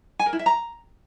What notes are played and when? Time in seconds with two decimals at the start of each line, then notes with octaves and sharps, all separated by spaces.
0.19 G#5
0.26 A#4
0.33 E4
0.39 E5
0.46 A#5